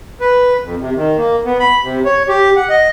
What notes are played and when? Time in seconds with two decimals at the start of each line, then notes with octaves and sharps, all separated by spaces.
0.21 B4
0.63 F2
0.81 C3
0.96 D#3
1.17 A#3
1.45 B3
1.60 B5
1.83 C3
2.05 C#5
2.28 G4
2.56 F#5
2.69 D#5